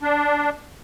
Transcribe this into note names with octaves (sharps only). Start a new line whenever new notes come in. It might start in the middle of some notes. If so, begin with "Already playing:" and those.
D4